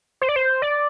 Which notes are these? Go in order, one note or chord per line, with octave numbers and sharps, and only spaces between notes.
C5
D5
C5
D5